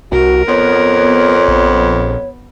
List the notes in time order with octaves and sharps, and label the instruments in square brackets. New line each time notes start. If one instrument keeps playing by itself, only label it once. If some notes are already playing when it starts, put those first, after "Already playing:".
[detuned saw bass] C2 [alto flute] F#4 [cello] A#4
[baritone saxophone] F2 [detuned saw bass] B3 [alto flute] C#5
[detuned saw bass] A#1 [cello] B3